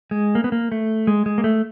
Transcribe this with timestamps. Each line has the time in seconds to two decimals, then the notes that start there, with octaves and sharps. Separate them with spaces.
0.11 G#3
0.35 A#3
0.44 B3
0.52 A#3
0.72 A3
1.07 G#3
1.26 G#3
1.38 A#3
1.44 A3